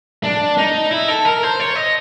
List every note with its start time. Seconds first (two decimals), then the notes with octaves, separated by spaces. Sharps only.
0.24 D4
0.58 D#4
0.91 E4
1.08 A4
1.25 A#4
1.43 C5
1.60 C#5
1.76 D#5